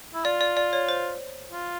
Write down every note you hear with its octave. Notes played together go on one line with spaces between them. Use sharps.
E4
F4 D5
D5
D5
C#5
C5
F4